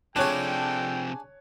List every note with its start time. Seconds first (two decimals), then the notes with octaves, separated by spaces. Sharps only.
0.16 C3 F3 D4 G#4 A4 C#5 G5 F#6